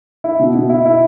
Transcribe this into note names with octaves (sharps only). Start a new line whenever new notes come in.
E4
B2
B2
E4
E4